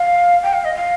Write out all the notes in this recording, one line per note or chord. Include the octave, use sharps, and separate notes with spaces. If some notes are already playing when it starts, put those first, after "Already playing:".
Already playing: F5
G5
F5
D#5
F5